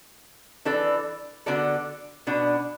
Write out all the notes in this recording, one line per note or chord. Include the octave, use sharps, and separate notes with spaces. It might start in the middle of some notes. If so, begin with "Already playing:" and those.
E3 D4 A4 D5
D3 B3 F#4 A4 D5
B2 B3 D4